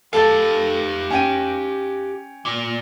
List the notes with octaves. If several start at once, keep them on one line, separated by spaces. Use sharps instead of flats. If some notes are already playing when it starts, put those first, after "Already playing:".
G4 A4 F5 A5 A6
C#4 G5 D#7
A#2